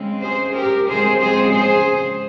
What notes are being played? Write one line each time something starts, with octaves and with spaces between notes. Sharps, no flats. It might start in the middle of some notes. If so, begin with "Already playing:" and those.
Already playing: C#3 G#3 C4
G#4 C5
G4 A#4
C#3 F3 G#3 C4 G#4 C5
G#4 C5
G#4 C5